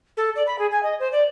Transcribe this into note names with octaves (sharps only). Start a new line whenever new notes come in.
A4
D5
B5
G#4
G#5
D#5
C5
D5